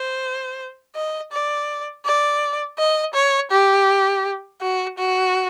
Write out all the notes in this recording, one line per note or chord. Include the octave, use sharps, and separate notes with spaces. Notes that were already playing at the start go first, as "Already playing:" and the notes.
Already playing: C5
D#5
D5
D5
D#5
C#5
G4
F#4
F#4